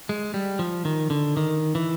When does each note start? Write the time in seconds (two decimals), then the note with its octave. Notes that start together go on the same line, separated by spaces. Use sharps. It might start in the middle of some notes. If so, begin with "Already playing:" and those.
0.09 G#3
0.34 G3
0.59 F3
0.85 D#3
1.10 D3
1.37 D#3
1.75 E3